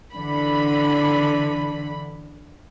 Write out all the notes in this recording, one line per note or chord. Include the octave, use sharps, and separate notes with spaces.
D3 E3 B5